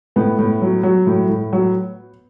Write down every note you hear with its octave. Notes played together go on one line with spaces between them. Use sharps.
A2 B3
A2
F#3
F#3
A2
A2
F#3